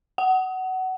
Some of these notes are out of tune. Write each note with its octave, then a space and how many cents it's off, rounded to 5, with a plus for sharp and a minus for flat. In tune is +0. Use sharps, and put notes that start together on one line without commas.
F#5 +20